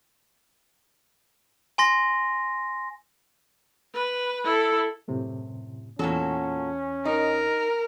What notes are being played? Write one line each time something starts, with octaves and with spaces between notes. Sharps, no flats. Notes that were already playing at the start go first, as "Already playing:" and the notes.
G#5 C6 A#6
B4
E4 A4
F#2 A2 C3
E2 A#2 C#4 F#4 A4
D#4 A#4